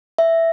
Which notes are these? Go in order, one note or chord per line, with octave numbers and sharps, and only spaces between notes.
E5